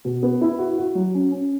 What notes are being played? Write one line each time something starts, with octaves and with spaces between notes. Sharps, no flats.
B2
B3
E4
F#4
F#4
F#3
C#4
C#4